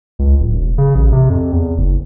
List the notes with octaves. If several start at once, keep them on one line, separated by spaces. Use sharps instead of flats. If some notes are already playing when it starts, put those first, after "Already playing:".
C#2
D1
E1
C#3
A1
C3
F2
E2
F#1